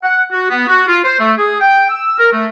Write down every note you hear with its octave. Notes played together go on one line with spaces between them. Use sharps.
F#5
F#4
B3
F#4
F4
C5
A3
G#4
G5
E6
A#4
A3